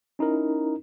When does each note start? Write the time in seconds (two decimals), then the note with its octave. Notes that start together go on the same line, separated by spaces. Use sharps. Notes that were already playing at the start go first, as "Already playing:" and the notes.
0.19 C#4 D#4 E4 A#4